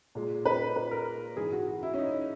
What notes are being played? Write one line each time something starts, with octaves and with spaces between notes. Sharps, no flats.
A#2 G#3
B4
B4
A#4
G#2 E3 G#3 G#4
F#4
F#4
E4
C#4
D#4